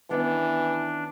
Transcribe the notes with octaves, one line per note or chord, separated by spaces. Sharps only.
D#3 E3 B3 C#4 D4